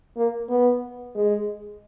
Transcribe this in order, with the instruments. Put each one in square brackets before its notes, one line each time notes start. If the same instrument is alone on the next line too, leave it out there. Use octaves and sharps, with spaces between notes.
[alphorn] A#3
B3
G#3